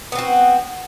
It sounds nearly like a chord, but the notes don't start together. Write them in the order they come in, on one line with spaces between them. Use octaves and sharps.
B3 C4 F#4